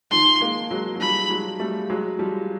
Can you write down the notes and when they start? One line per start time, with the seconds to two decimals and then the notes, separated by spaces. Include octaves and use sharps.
0.11 D#3 F3 C6
0.40 G#3 A#3
0.71 F#3 G#3
0.96 F#3
1.00 F3 G3 B5
1.30 F#3 G#3
1.59 G3 A3
1.90 F#3 G#3
2.19 F3 G3